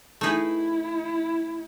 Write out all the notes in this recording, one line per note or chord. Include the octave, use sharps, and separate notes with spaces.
A3 D#4 E4 G#4 B4